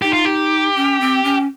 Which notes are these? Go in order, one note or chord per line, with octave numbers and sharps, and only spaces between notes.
D#4 G4
F4
G4
C#4
C4
C#4